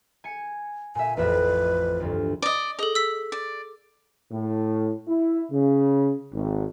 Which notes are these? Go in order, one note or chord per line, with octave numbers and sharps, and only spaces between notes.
G#5 C#7
A#2 E5 G#5
A1 F2 B4 E5
D2 G2
D5 D#5
G#4 A4 D#5
E6 B6
D5
A2
E4
C#3
G#1